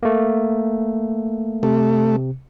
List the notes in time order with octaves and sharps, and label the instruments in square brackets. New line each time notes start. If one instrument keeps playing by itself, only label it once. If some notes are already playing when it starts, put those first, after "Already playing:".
[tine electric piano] A3 A#3
[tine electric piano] C3 [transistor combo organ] A3